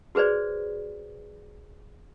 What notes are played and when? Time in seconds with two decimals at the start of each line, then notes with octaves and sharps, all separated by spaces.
0.15 F#4 G#4 B4 C5 D5